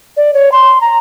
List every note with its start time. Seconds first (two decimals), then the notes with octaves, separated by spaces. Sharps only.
0.16 D5
0.33 C#5
0.51 C6
0.81 A#5